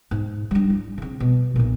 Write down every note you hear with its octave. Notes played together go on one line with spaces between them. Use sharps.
G#2
G3 D4
E4
C#3 C4
B2
B1 A#2